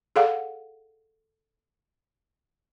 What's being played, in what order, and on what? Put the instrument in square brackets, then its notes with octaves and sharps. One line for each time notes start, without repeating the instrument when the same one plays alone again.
[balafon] G#4 A4 D5 F5 F#5